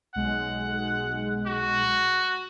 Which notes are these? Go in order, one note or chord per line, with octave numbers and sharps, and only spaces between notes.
B1 G#3 F#5
F#4